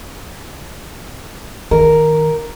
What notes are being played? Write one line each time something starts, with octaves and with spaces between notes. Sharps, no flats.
D#3 A#4